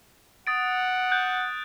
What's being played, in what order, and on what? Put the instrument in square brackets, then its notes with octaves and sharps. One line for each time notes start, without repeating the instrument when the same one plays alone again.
[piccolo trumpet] F#5 [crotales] D#6 A6 D7
[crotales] F#6 G6